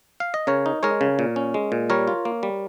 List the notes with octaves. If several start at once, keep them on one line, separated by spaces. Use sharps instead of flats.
F5
D#5
C#3 A#4 C#5
D#4
G#3 A#4 C#5
C#3
A#2
C#4
G#3
A#2
G3 A#4 C#5
F4
A#3
G3